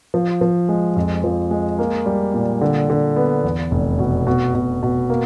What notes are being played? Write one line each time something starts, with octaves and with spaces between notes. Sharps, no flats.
F3
F3
G#3
F2
F3
G#3
A#3
G3
A#2
D3
D3
B3
E2
F1
B2
B2
B2
B2
A#3